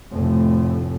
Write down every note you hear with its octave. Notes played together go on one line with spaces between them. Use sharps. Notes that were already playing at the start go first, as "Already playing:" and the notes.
F1 A2